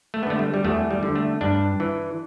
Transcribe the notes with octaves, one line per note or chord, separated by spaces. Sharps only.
A3
B3
D3 A3
G3
G3
E2 A3
G3
D3
A3
G2 D4
E3